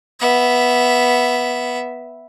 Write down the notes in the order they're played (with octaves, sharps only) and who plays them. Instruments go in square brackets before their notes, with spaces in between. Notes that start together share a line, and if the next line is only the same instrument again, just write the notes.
[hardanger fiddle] B3 E5